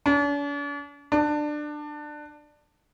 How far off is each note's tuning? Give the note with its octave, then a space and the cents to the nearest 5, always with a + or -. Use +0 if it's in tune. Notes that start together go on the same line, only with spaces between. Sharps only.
D4 -45
D4 +20